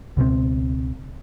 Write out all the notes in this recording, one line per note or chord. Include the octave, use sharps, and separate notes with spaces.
C#2 B2 F3 C4